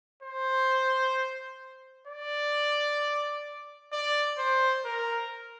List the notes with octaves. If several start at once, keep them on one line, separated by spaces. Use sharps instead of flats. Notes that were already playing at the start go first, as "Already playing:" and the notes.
C5
D5
D5
C5
A#4